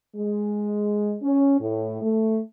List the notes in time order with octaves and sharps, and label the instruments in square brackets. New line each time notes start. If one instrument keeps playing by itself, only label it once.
[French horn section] G#3
C#4
A2
A3